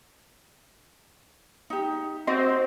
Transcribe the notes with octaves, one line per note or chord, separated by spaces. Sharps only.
D#4 G4
C4 F#4 D#5